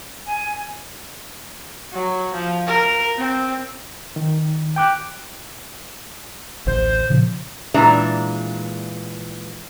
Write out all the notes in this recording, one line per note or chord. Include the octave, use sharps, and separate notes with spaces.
G#5
F#3
F3
A#4
C4
D#3
G5 D6 F#6
A1 D2 C5
A#2 C#3 F3
A#2 E3 G#3 D4 E5 A#5